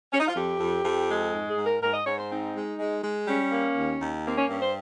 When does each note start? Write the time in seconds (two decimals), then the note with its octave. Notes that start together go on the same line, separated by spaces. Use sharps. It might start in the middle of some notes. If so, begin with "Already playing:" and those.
0.13 C#4
0.20 D#4
0.28 F4
0.36 F2 G4
0.60 F2
0.85 F2
1.09 G#3
1.33 G#2
1.50 G#4
1.57 G#2
1.66 A#4
1.82 G#2 A#4
1.94 D#5
2.06 G#2 C#5
2.18 C5
2.30 C4 D#4
2.55 G#3
2.79 G#3
3.04 G#3
3.28 G3 C#4
3.52 A#3
3.77 D#2
4.01 D#2
4.25 A#3 C4
4.38 C#4
4.49 G2 C#4
4.62 C5